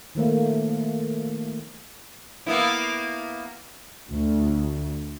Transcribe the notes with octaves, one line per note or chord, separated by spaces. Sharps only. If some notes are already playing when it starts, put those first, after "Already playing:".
D#3 F3 A3 A#3
A#3 B3 E4
D2